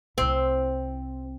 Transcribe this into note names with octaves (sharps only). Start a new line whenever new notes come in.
C2 C4 E4